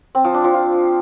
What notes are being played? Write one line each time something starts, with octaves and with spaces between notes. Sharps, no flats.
C4
F3
D4
F3
F4